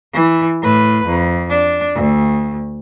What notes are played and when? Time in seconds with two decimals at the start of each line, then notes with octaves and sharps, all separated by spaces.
0.13 E3
0.62 A2 B4
1.06 F2
1.49 D4
1.95 D2